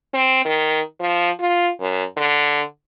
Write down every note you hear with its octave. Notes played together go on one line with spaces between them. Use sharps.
C4
D#3
F3
F4
F#2
D3